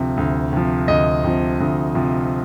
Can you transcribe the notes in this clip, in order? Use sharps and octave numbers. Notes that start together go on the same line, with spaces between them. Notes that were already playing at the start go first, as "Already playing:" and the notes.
Already playing: D2 C3 F3
D2
C3 F3
D2 D#5
C3 F3
D2
C3 F3